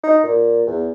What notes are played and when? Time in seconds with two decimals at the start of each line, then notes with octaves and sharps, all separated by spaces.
0.03 D#4
0.24 A#2
0.67 E2